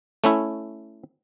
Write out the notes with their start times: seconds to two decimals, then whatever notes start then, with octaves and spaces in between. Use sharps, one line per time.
0.24 A3 C#4 E4